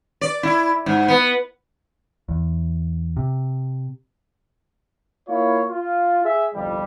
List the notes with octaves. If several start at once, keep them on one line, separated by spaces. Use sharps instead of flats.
D5
E4
G#2
B3
E2
C3
A#3 E4 F4 C#5
F4
G#4 E5
G1 C2 F2 G3